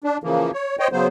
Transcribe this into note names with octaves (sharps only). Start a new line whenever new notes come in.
D4
C#3 E3 F3 A#3
C#5
C5 C#5 D#5 G5
C#3 F#3 B3 C5